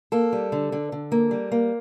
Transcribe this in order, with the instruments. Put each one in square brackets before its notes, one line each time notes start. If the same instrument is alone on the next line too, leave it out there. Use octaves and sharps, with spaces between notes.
[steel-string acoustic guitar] A#3 A4
G3
D3
D3
D3
A#3
G3
A#3